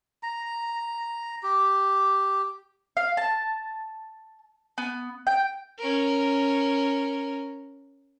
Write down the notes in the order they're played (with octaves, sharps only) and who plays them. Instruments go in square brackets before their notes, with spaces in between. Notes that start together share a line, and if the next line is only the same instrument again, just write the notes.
[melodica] A#5
G4
[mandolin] F5
A5
B3
G5
[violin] C#4 A#4